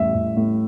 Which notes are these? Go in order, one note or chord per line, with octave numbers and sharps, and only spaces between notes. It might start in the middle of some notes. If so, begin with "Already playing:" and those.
Already playing: A1 A2 G3 E5
A1
A2